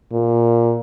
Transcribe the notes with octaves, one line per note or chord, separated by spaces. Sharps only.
A#2